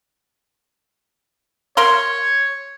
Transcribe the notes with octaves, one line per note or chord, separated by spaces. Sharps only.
A#4 C#5 F5 C6